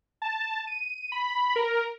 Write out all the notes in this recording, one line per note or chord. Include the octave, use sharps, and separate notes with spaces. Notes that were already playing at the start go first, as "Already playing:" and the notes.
A5
D#7
B5
A#4